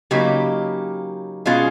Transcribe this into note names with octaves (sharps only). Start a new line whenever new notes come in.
C#3 F#3 A#3 D#4 G4
B2 G#3 C#4 F4 G#4